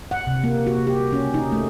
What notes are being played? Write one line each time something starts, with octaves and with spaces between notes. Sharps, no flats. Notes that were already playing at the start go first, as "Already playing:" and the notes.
F#5
C3
A#3
F#4
G4
C#4
D#4
A3